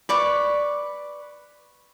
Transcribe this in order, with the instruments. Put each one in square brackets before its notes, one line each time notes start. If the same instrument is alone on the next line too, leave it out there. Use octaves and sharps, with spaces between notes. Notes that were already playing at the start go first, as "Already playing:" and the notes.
[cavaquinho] B4 D5 C#6